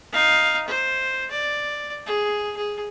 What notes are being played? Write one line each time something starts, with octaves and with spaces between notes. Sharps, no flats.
D#4 F5
C5
D5
G#4
G#4